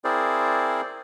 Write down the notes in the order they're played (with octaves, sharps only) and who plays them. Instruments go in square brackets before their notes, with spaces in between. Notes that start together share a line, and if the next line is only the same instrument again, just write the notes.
[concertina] C4 E4 G#4 A#4 C5 D5